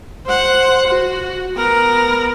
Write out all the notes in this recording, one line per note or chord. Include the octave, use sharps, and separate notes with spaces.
C5 F#5
F#4
B3 A#4